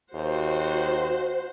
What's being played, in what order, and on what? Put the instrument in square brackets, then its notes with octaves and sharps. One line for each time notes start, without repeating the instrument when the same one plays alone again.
[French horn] D#2 [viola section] F#4 C5